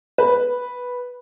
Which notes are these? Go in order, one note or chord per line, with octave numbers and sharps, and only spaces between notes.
B4